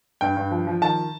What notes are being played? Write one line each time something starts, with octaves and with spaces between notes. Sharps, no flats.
G2 G5
G2
F3
F3
D#3 A5